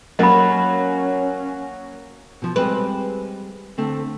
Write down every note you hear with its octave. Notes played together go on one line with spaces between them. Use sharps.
F#3 A#3 C#4 F#4 D#5 B5
B2 F3
G3 G#3 C4 B4
D3 A3 C4